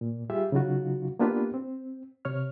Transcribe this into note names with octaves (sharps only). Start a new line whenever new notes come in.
A#2
G3 F4 G4 G#4 E5
C#3 F#3 D#4 F4 F#4
A#3 B3 D4 F4 G4 B4
C4
C3 C#5 F6